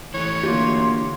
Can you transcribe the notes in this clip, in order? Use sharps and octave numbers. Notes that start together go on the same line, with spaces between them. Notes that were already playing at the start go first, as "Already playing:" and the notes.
E3 A3 C#5
F#2 D3 A#3 F4 G4 C6